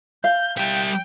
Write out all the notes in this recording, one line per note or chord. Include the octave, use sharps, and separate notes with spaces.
F5 G6
G3 E5 G5